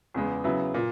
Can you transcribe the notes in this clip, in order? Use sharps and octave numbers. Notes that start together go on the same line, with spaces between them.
E2 C#3 G#3 B3
C#3 F#3 B3 E4
A#2